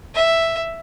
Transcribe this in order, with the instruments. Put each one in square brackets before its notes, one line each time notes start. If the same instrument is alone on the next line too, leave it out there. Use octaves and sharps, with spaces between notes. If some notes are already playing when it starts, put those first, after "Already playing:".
[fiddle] E5